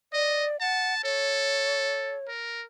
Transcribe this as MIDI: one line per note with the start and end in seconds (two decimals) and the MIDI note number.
0.13 0.60 74
0.13 0.46 75
0.60 0.95 78
0.60 1.02 81
1.04 2.17 69
1.04 2.26 73
2.28 2.63 70